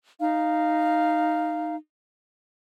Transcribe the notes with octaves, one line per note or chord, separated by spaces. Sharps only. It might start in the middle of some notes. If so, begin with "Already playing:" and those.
D#4 F5